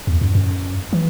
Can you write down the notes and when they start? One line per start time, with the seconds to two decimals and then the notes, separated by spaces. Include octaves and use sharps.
0.07 E2
0.21 F#2
0.35 F#2
0.93 E3